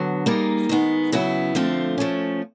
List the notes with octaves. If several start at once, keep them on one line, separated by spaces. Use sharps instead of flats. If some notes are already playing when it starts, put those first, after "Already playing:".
Already playing: D3 F#3 B3
G3 A#3 D#4 G#4
D#3 G#3 B3
C#3 F#3 B3 E4
D3 F3 A3 C4 F4
F3 A3 C#4